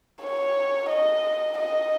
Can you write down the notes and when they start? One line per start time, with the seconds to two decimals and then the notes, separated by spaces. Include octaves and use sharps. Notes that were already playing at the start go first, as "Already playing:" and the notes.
0.22 C#5
0.89 D#5
1.58 D#5